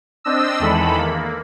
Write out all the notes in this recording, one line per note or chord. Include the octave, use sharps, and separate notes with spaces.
C4 D4 D#5 E6
E2 D#3 E3 G#3 A4 B5
A#3